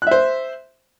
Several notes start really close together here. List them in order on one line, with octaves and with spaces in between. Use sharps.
F#6 E5 C5